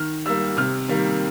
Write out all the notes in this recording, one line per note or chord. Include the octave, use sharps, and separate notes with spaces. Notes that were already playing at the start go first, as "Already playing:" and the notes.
Already playing: D#3 F6
G3 A#3 E6
C3 F6
D#3 G3 A#3